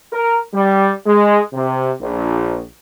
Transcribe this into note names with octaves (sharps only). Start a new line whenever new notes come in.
A#4
G3
G#3
C3
A#1